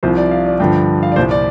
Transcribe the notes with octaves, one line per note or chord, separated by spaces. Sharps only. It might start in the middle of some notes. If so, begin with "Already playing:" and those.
C2 C3 F3 C5
D5
F5
D5
G2 D3 F3 G5
F5
D5
C2 A#2 F3 C5
D5